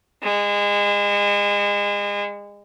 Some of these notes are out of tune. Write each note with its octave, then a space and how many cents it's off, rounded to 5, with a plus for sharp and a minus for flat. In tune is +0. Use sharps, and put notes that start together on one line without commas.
G#3 -30